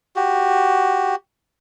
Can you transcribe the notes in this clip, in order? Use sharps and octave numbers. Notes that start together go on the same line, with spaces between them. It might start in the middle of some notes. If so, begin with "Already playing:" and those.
F#4 G4